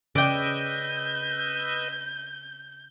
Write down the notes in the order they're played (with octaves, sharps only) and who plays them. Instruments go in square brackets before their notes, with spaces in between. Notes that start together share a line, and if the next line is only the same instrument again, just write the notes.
[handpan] C#3 [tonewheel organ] B4 D#5 E6 [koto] D5 G5 [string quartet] G6